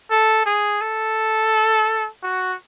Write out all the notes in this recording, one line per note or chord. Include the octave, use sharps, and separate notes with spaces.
A4
G#4
A4
F#4